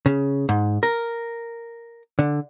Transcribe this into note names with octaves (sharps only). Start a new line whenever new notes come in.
C#3
G#2
A#4
D3